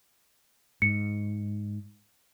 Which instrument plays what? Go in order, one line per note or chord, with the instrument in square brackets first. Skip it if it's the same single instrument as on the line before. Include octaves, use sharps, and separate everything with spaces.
[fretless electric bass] G#2 [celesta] C#7